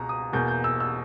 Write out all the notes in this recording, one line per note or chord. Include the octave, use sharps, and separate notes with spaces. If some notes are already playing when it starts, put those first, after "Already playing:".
Already playing: C#2 B2 A#5
D#6
E2 B2 A#3 G6
G6
E6
E6